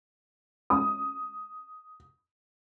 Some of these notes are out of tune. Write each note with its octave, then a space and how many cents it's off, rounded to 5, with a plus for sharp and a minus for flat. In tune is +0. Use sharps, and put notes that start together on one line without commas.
D#6 +10